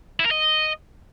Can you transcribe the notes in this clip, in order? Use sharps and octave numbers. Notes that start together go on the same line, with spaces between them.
E4
A#4
D#5